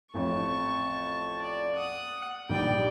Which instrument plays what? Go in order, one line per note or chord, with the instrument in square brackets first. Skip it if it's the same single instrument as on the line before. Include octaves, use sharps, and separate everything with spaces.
[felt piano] A1 F2 C#5 [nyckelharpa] A5 C#6
[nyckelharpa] D5
F#5 D#6
[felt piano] A#1 D#3 G3 [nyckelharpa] D5 G5